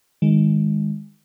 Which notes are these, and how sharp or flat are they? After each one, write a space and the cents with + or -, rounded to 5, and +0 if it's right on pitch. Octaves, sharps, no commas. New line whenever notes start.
D#3 +0 G#3 -15